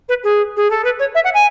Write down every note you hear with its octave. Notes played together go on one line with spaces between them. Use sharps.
B4
G#4
G#4
A4
B4
C#5
E5
F#5
G#5